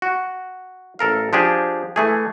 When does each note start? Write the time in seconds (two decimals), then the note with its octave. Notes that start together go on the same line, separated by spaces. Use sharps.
0.02 F#4
0.99 A1 A4 A#4 F5
1.33 F3 D4 G4 G#4
1.96 E3 A3 G#4